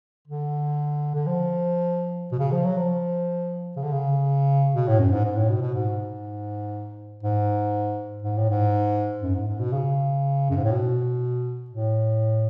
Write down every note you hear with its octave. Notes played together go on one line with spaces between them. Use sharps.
D3
D3
F3
B2
C#3
F3
F#3
F3
C#3
D3
C#3
B2
A2
F#2
G#2
G#2
A2
B2
B2
G#2
G#2
G#2
A2
G#2
F#2
G#2
G#2
B2
C#3
F#2
G#2
A2
B2
A2